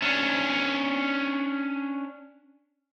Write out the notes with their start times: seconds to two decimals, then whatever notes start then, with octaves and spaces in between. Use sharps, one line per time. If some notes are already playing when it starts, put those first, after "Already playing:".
0.02 C#4 D4